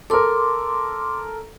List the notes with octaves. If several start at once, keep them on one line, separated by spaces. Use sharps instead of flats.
A4 A#4 C6 D6